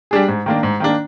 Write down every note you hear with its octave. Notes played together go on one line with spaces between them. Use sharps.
G3 D4 G#4
G#2
D#3 A#3 D4
G#2
D#3 A#3 D4